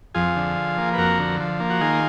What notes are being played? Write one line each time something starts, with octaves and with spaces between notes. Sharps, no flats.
F2 F4 G#4
D3
F3
A#3
B4
F2 F#4 A#4
D3
F3
A#3
F#4
D#3 F4 G#4